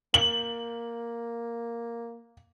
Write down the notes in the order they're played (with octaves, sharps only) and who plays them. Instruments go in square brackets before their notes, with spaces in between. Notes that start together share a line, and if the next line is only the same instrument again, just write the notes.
[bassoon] A#3 [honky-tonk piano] F#7